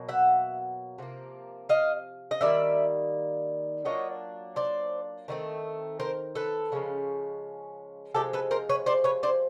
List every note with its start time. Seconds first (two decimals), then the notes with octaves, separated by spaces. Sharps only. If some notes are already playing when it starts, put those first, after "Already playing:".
Already playing: B2 F#3 A#3
0.09 E5 F#5
0.98 C3 F3 A#3
1.69 D#5 F5
2.31 D#5
2.41 D#3 G3 A#3 D5 E5
3.85 F#3 A#3 D4 F4 C#5 D#5
4.56 C5 D5
5.28 D#3 F#3 A3 C4
6.00 A#4 C5
6.35 A4 B4
6.72 C#3 F3 G#3 C#4
8.14 C3 F3 G#3 G4 A4
8.33 A4 B4
8.51 A#4 C5
8.69 B4 C#5
8.86 C5 D5
9.04 B4 C#5
9.23 C5 D5